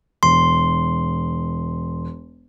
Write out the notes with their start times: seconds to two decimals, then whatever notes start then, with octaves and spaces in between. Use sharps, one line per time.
0.23 E1 C6